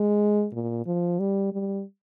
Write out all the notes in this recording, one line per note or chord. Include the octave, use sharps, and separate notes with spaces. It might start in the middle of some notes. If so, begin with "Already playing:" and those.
Already playing: G#3
A#2
F3
G3
G3